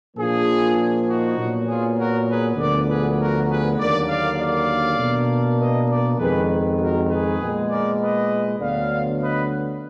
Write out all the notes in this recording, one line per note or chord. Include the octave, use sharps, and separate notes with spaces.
A#2 F3 A#3 D4 F4 G#4
D#4 F#4
A#2 F#3 B3
F4 G#4
F#4 A#4
G#4 B4
D2 D3 F3 B3 A#4 D5
G#4 B4
F#4 A#4
G#4 B4
D#2 D3 F#3 A#3 A#4 D5
D5 F5
D5 F5
B2 A#3 D4
B4 D#5
A#4 D5
F2 D#3 G#3 G#4 B4
F#4 A#4
G#4 B4
A#2 G#3 B3
A#4 D5
B4 D#5
D2 D3 F#3 B3 D5 F5
B4 D#5